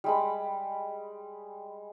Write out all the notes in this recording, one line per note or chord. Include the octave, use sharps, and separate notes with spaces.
G3 G#3 B5